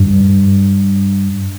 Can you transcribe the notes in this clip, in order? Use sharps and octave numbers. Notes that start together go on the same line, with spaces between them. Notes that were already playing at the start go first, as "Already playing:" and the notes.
Already playing: G2